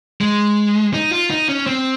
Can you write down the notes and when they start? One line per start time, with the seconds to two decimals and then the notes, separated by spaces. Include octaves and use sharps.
0.21 G#3
0.94 D#4
1.12 F4
1.30 D#4
1.49 C#4
1.67 C4